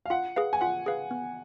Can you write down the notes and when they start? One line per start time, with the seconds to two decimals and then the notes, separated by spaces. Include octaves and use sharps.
0.06 F5
0.10 F4 F#5
0.36 G#4 B4 F5
0.53 G#5
0.61 F4 F#5
0.86 G#4 B4 F5
1.11 B3